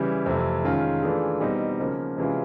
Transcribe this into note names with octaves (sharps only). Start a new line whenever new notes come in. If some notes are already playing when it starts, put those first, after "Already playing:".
Already playing: C#3 E3 G3
F2 C3 E3 A3
D#3 G#3 C#4 F4
E3 A3 D4 F4 G#4
B2 G3 C4 D#4
C#3 F3 A#3
C3 E3 G#3 C#4 F4